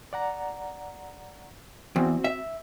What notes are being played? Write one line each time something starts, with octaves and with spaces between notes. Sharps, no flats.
D5 F#5 A#5
E2 C4 F#4
E5